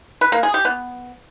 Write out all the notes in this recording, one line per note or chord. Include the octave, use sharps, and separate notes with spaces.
B4
A#3
G#4
G4
B3